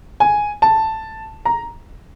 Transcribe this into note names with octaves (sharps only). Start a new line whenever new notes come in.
G#5
A5
A#5